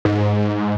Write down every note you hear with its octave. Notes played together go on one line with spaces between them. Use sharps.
G#2